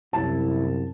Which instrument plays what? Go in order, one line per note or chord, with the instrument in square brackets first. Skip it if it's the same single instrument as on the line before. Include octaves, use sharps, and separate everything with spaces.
[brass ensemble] C2 F#2 [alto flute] E4 [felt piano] A5